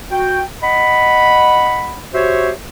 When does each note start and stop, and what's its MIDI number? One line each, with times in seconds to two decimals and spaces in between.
0.11 0.42 66
0.11 0.42 79
0.63 2.01 75
0.63 2.01 78
0.63 2.01 83
2.13 2.50 66
2.13 2.50 67
2.13 2.50 72
2.13 2.50 73
2.13 2.50 76